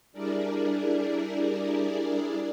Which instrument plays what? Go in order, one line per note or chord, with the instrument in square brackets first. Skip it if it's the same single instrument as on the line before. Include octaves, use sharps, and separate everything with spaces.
[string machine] G3 D4 E4 G#4 A#4 D5